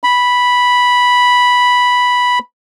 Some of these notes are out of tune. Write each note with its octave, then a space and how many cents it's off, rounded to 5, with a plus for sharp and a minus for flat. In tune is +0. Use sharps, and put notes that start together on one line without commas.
B5 -5